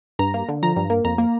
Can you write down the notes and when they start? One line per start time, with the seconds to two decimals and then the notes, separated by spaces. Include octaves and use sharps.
0.19 G2 A#5
0.34 A#3
0.49 D3
0.63 F3 A#5
0.76 G2
0.90 A#3
1.04 F2 A#5
1.18 A#3